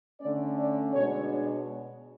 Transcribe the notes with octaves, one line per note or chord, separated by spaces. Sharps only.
D3 A3 C#4 D5
D5
B2 G#3 D4 C#5